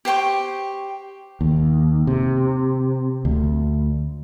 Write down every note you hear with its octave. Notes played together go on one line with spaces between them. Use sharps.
G4 C5 G5 C#6
D#2
C3
D2